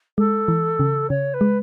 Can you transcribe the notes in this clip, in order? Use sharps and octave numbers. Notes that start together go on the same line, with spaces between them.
G#3 A4
E3
C#3
C#3 C#5
B4
G#3